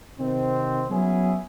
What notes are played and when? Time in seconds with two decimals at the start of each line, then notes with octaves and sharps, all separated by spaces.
0.19 C3 D#3 C4
0.90 F#3 B3 C#4 E4 G#4